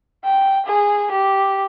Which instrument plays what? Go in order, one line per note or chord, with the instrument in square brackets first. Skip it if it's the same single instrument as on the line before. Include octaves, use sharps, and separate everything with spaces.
[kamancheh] G5
G#4
G4